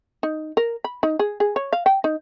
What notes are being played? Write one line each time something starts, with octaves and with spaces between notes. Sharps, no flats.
D#4
A#4
B5
D#4
G#4
G#4
C#5
F5
G5
D#4